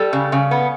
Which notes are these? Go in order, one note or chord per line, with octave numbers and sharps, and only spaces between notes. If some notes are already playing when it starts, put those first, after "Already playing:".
Already playing: G3 A4
C#3
C#3
B3